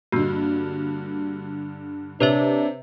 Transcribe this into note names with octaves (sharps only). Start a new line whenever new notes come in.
G2 D3 A#3 F#4
C3 D4 B4 C#5 E5